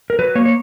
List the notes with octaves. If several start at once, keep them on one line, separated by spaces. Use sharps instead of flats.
A#4
F#3 B4
A#3 C#5
C#5